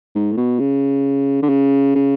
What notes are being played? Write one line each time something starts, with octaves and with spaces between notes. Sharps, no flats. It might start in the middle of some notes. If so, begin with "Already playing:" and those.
G#2
A2
B2
C#3
D3
C#3
C#3